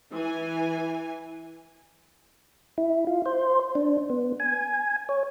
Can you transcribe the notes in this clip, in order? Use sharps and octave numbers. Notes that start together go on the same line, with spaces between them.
E3 G#5
E4
F4
C5
D4
B3
G#5
C#5